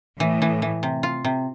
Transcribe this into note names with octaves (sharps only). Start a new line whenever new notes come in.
A2 E3
E3
E3
C3
F4
C3